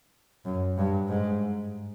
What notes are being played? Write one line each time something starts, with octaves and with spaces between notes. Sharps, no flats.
F#2
G2
G#2